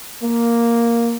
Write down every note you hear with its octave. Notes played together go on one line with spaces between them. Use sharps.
A#3